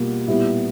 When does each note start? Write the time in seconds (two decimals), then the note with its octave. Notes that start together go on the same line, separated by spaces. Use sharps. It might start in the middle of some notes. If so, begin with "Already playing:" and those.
Already playing: B2 G3 A#3 F4
0.28 A#2 G3 B3 E4